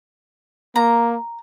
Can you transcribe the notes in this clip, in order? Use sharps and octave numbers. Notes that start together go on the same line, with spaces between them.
A#3 A#5